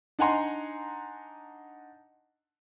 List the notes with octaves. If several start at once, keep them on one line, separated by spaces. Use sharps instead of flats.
D4 D#4 F#5 G#5 A#5 C6